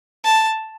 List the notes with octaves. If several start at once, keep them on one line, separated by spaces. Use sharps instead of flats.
A5